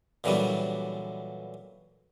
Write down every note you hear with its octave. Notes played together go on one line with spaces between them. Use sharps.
A#2 D3 E3 F#3 G3 B3